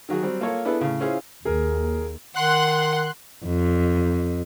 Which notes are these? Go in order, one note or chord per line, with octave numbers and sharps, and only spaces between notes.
D#3 F#3 F#4 G#4
F#3 G3 C4
A#3 F4 A4 C#5
B3 D4 E4 G#4 A4 B4
A2 C#3
C#4 E4 F4 G#4 C5 F5
D#2 G#4 A#4
D#3 F#5 C6 F#6
F2